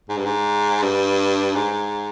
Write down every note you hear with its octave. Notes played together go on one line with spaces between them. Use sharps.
G#2
G2
G#2
G2
G#2